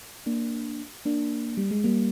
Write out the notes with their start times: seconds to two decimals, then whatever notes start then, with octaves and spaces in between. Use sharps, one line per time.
0.26 A#3 D4
1.05 A#3 D4
1.57 G3
1.71 G#3
1.84 G3 A#3